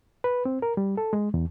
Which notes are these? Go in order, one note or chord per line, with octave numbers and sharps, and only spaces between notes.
B4
C4
A#4
G3
A4
G#3
E2